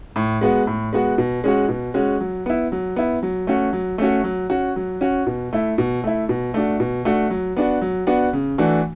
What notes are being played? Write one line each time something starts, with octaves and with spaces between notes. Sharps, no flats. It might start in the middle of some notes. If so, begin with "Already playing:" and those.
A2
G#3 B3 F#4
A2
G#3 B3 F#4
B2
G#3 C#4 F#4
B2
G#3 C#4 F#4
F#3
B3 E4
F#3
B3 E4
F#3
A3 C#4 F#4
F#3
A3 C#4 F#4
F#3
C#4 F#4
F#3
C#4 F#4
B2
A3 E4
B2
A3 E4
B2
A3 D4 F#4
B2
A3 D4 F#4
F#3
B3 D4 F#4
F#3
B3 D4 F#4
C#3
E3 A3 D4 F#4